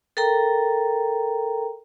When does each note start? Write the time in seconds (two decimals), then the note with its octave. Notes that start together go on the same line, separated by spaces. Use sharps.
0.17 A4 A#4 G5 A#5